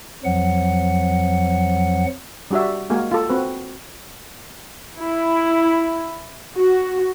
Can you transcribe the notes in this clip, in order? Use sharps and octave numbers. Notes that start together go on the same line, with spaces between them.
F2 F3 F#3 F#5
G3 D4 F#4 D5 E5
G#3 A#3 F#4 A#4 G#5
F4 A4
C4 F#4 B4
E4
F#4